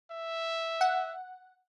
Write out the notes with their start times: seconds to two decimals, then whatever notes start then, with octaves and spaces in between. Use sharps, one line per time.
0.11 E5
0.81 F#5